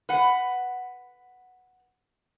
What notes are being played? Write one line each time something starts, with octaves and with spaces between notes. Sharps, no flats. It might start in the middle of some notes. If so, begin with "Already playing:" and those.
B4 F#5